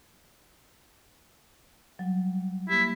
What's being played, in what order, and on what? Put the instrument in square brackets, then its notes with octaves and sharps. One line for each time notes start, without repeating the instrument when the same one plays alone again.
[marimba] F#3 G3
[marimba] A#3 G4 [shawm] E4